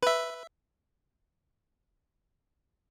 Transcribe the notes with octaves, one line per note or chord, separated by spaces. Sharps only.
B4 E5